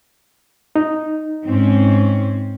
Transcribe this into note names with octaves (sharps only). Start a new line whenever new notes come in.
D#4
G#2 C4 C#4